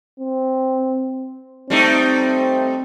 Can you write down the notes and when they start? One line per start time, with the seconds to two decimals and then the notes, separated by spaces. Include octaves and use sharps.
0.20 C4
1.70 G3 A3 C4 D#4